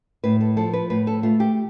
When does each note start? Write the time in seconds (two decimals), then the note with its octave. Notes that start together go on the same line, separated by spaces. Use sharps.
0.24 A2 B4
0.41 A4
0.57 F3 A4
0.73 B4
0.90 A2 B4
1.07 A4
1.23 A3 F4
1.40 G4